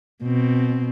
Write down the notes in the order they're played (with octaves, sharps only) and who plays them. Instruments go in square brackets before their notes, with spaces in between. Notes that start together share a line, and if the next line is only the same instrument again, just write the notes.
[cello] B2 C4